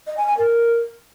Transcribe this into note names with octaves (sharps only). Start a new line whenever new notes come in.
D#5
G#5
G#5
A#4